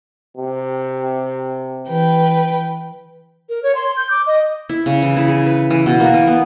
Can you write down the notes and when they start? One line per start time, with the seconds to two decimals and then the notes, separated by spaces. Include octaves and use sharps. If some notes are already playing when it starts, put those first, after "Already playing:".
0.37 C3
1.88 E3 B4 G5
3.49 A#4
3.63 C#5
3.75 C6
3.97 G6
4.11 D6
4.26 D#5
4.69 E4
4.86 C#3
5.02 E3
5.17 E4
5.28 G#4
5.46 B4
5.70 E3
5.86 B2
6.00 A#3
6.14 E3
6.27 B3